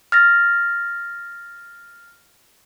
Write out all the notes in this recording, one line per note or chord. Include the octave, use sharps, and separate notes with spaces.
F6 A6 A#6